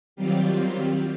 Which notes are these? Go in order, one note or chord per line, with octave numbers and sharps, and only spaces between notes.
D#3 F#3 G3 C4 F4 G4